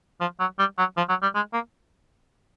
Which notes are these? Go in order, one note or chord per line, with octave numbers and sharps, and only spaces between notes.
F3
F#3
G3
F#3
F3
F#3
G3
G#3
A#3